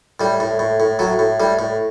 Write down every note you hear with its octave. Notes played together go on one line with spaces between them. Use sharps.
A2 G3
A2
A2
A2
A2 F#3
A2
A2 G3
A2